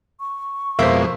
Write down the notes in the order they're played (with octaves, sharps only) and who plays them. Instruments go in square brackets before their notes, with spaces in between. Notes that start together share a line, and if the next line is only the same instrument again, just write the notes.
[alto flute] C#6
[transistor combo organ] F2 B2 G#3 [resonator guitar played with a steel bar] A#3 [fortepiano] C5 E5